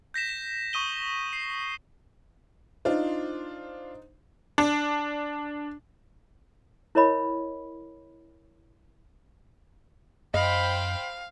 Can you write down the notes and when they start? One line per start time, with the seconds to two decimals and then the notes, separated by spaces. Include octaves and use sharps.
0.14 G6 A#6 B6 E7
0.29 E7
0.73 C#6 D#6 D#7 G7
1.33 C7
2.85 D4 D#4 F4 C5
4.58 D4
6.95 E4 A#4 C#5 D#5 B5
10.34 F#2 C5 D#5 F5 G5 B5